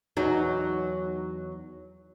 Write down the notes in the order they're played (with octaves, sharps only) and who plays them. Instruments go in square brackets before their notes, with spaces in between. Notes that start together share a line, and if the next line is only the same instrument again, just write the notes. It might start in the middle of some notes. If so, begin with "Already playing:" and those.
[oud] E2 F#3 D#4